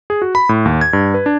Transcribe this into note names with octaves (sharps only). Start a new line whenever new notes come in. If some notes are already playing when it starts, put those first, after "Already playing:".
G#4
F#4
B5
A2
D#2
G#6
G2
B4
D4